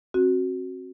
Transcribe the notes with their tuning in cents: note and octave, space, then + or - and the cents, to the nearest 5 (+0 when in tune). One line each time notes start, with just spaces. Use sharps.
C4 +30 F#4 +0